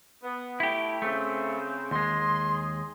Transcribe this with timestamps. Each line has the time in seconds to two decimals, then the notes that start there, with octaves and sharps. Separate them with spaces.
0.22 B3
0.60 A3 E4 G4
1.02 C#3 A3 C4
1.91 D#2 G#3 G#4 C6